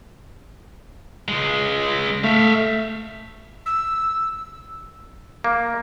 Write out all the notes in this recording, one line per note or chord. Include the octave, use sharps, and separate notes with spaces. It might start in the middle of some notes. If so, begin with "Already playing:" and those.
C#2 G#3
A3 E5 F5
E6
A#3